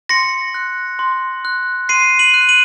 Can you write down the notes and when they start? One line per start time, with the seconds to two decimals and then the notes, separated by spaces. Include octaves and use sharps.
0.09 C6 A#6 C#7
0.54 F#6
0.99 C6
1.45 F#6
1.89 C6 C7 D#7
2.19 D#7 F#7
2.34 F#6
2.49 D#7 F#7